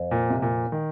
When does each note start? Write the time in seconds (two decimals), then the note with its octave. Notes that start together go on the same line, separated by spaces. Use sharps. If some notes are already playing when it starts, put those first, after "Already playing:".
Already playing: F2
0.11 A#2
0.30 C3
0.42 A#2
0.72 D#3